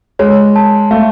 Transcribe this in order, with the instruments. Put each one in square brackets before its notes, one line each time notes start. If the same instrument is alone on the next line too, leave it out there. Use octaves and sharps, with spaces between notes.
[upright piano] G#3 [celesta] C#5
[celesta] A5
[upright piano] A3 [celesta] F5